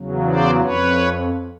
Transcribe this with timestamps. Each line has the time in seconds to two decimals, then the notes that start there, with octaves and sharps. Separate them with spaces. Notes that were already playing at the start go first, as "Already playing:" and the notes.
Already playing: E2 C#3 F#3
0.26 C5 D5
0.60 F2 B4 C#5